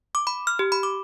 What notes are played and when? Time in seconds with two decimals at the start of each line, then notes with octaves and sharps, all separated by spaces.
0.15 D6
0.27 B5
0.47 F6
0.59 G4
0.72 B5
0.83 D6